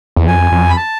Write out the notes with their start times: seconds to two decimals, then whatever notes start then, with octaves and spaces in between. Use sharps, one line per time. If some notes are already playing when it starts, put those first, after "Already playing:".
0.16 E2
0.27 F2 G#5
0.52 F2
0.70 B5
0.77 A5